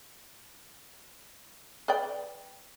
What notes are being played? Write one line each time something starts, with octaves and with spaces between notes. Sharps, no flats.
B4 D5 G5